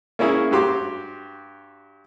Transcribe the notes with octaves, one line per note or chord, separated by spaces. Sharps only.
A#3 C#4 E4 G#4
G2 F#4 G4 C6 D6